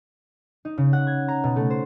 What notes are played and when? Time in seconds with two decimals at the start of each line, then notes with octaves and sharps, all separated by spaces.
0.65 D#4
0.78 C#3
0.93 F#5
1.07 G#6
1.28 A#5
1.44 B2
1.56 A3
1.70 C5